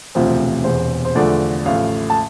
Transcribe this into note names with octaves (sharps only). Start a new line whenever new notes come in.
E1 D2 C3 F3 C5
E1 E2 C3 C5
C5
E2 D3 F3 A3 D5
A1 A2 F3 A3 F5
A5